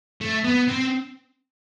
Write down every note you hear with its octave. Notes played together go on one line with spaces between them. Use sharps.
A3
B3
C4